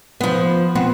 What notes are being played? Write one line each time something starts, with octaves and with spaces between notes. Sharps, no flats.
F3 B3
B3 C4